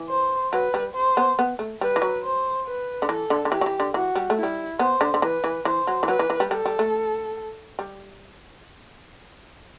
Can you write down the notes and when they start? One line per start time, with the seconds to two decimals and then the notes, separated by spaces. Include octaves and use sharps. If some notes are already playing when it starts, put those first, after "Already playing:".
Already playing: E3
0.10 C5
0.53 F#3 B4
0.74 G3
0.95 C5
1.17 B3
1.39 B3
1.59 A3
1.81 G3 B4
1.96 E3
2.02 F#3
2.24 C5
2.67 B4
3.02 D3
3.09 E3 A4
3.30 D3
3.45 D3
3.51 E3 G4
3.61 F#3
3.66 E3
3.80 D3
3.94 E3 F#4
4.16 G3
4.30 A3
4.37 E4
4.43 G3
4.79 B3 C5
5.01 D3
5.14 D3
5.22 E3 B4
5.44 E3
5.65 E3 C5
5.87 F#3
6.03 E3
6.08 F#3 B4
6.19 E3
6.30 E3
6.40 G3
6.51 G3 A4
6.66 G3
6.79 A3
7.79 G3